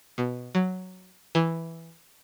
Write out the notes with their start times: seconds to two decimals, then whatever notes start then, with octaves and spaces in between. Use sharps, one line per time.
0.18 B2
0.55 F#3
1.35 E3